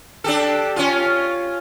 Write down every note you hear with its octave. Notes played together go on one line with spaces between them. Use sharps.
D4 G4 A4
C#4 F4